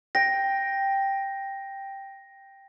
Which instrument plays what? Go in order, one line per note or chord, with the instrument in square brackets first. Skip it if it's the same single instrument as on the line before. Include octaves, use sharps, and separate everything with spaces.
[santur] G5 [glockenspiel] A#6